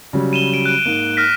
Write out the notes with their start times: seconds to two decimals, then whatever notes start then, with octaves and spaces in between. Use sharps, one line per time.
0.13 C#3 F#3 G3
0.33 D#7 E7 G7
0.54 D7
0.66 F#6 D7
0.86 G#2 A#3
1.17 F6 A#6 B6